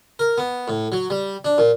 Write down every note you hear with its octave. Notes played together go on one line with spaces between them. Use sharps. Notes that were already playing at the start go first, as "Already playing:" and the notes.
A#4
B3
A2
F#3
G3
D4
A#2